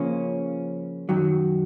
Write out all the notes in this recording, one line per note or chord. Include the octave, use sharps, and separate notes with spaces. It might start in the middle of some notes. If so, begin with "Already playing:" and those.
Already playing: C#3 F3 A#3 C#4
F#2 D#3 F#3